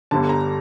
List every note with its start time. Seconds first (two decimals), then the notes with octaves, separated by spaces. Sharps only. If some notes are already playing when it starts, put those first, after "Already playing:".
0.11 G1 G2 D3 A5
0.29 A#5